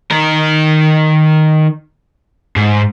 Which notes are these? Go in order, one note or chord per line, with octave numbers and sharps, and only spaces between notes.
D#3 A#4
G#2